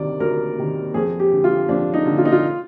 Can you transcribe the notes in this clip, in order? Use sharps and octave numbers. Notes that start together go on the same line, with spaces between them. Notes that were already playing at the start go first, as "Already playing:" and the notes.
Already playing: D2 C3 D#3 D5
D2 A#4
C3 D#3
F2 G#4
G4
D3
F4
F2 D4
D#4
D3
F4
D#4
F4